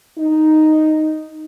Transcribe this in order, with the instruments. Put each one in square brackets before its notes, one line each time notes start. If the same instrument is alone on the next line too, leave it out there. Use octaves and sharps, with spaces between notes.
[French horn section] D#4